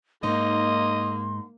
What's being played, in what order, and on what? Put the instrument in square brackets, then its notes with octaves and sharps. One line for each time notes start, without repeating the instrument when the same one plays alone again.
[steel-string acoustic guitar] G#2 D#4 [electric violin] A#3 [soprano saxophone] D#5 [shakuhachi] C6